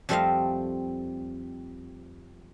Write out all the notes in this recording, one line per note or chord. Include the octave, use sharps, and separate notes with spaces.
F2 G3 A3 C4 D#5 F5